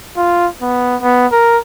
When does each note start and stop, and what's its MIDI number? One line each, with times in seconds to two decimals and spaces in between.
0.17 0.47 65
0.62 0.96 59
1.02 1.26 59
1.32 1.57 70